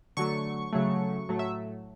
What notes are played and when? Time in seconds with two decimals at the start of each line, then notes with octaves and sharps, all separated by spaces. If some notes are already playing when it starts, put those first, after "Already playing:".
0.17 D3 F#3 A3 C#6
0.73 C#3 F#3 A3
1.29 A2 F#3 A3
1.39 E5